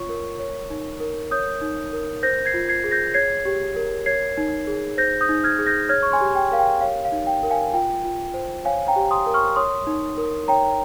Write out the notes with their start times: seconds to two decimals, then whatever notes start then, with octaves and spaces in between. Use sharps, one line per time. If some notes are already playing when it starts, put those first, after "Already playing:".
Already playing: F4 C#5 C#6
0.09 A#4
0.39 C#5
0.70 D#4
1.00 A#4
1.31 C#5 D#6 G6
1.61 D#4
1.93 A#4
2.23 C5 G6 A#6
2.45 G#6 C7
2.54 F4
2.69 G#6 C7
2.84 G#4
2.91 G6 A#6
3.14 C#5 G#6 C7
3.45 G4
3.76 A#4
4.06 C#5 G#6 C7
4.37 D#4
4.67 G#4
4.98 C5 G6 A#6
5.21 D#6 G6
5.29 D#4
5.44 F6 G#6
5.59 G#4
5.66 G6 A#6
5.89 C#5 F6 G#6
6.03 C#6
6.12 G#5 C6
6.21 G4
6.35 G5
6.52 A#4 F5
6.59 G5
6.81 C#5 F5
7.05 F5
7.12 D#4
7.27 G5
7.43 A#4
7.50 F5 G#5
7.74 F4 G5
8.04 F4
8.34 C5
8.65 C#5 F5 G#5
8.88 G5 A#5
8.96 G4
9.11 C6 D#6
9.26 A#4
9.34 C#6 F6
9.56 C#5 C6 D#6
9.87 D#4
10.17 A#4
10.48 C#5 G5 A#5